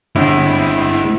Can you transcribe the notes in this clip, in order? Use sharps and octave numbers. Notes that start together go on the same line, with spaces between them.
G1 G#3 C4 E4